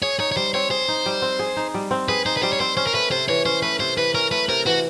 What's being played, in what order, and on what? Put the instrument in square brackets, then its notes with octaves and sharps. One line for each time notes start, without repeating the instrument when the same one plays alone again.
[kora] G#4 [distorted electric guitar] C#5
[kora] D#4 [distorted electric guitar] C#5
[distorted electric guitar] C#5
[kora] G3 [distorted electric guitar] C5
[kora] C4 [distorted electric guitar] C#5
[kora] G#4 [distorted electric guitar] C5
[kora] D#4
G3
C4
G#4
D#4
G3
C4
[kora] G#4 [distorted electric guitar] B4
[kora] D#4 [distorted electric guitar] C5
[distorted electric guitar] B4
[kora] G3 [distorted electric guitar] C5
[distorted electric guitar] C#5
[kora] C4 [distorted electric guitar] C5
[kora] C#4 [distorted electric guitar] C5
[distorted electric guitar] A#4
[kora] A3 [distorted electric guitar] B4
[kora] C3 [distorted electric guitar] C5
[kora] E3 [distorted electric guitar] C#5
[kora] C#4 [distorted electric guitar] C5
[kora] A3 [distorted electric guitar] B4
[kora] C3 [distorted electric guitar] C5
[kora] E3 [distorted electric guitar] B4
[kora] C#4 [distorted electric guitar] A#4
[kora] A3 [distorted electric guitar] B4
[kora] C3 [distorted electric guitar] A#4
[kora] E3 [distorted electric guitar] F#4